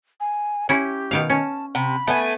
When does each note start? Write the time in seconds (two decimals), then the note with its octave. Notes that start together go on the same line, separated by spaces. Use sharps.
0.20 G#5
0.69 C#4 E4 G4
1.11 B2 D#3 F5
1.30 C#4 A5
1.75 C3 B5
2.07 A3 B3 G#5